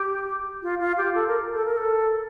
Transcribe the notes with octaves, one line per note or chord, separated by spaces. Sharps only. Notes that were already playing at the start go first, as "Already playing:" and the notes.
Already playing: G4
F4
F4
G4
A4
A#4
A4
A#4
A4